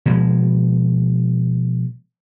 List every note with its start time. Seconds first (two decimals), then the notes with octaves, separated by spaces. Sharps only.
0.06 B2 F3 G#3